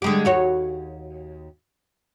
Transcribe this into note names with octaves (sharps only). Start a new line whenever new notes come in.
D3 G#3 G4
D#2 F#4 C#5